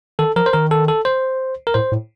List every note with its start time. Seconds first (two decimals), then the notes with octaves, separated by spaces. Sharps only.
0.19 D#3 A4
0.36 F3 A#4
0.46 C5
0.53 D#3 A#4
0.71 A4
0.88 A4
1.05 C5
1.67 A#4
1.74 A2 C5
1.92 A2